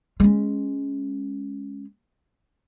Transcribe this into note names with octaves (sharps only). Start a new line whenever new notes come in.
G#3 C#4